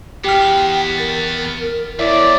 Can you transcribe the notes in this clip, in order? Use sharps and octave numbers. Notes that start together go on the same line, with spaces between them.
E2 B3 G4 G5 F6
A#4 A6
E2 E4 C#5 D5 E5